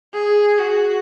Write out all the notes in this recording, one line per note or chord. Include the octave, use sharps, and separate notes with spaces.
G#4
F#4